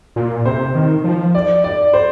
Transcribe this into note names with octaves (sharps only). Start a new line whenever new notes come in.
A#2
C3 C5
D#3
F3
D5
D5
C5